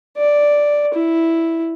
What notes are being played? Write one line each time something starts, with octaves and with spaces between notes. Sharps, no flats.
D5
E4